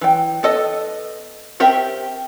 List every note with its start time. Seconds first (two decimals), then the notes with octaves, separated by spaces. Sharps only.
0.01 E3 G5
0.43 B3 A4 D#5
1.60 C4 G4 A#4 E5 G5